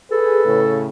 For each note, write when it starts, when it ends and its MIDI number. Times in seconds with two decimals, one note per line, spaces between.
0.12 0.42 68
0.12 0.87 69
0.12 0.65 71
0.46 0.88 45
0.46 0.88 49